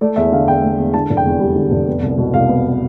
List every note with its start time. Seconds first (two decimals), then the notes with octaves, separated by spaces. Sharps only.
0.01 A3 D5
0.16 E2 E5
0.32 D3 F5
0.47 E2 G5
0.63 A3
0.78 E2
0.94 D3 A5
1.10 F1
1.17 G5
1.25 E2
1.40 G3
1.56 D3
1.72 F1
1.87 B3
2.03 C2
2.18 B2
2.34 C2 F5
2.49 B3